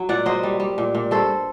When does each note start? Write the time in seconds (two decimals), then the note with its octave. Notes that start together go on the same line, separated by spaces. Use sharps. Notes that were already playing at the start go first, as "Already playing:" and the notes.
Already playing: F#3
0.09 A#2 D5 F#5
0.26 F#3 C5 D#5
0.43 G3
0.60 G3
0.78 A#2
0.95 A#2
1.11 G2 A4 C5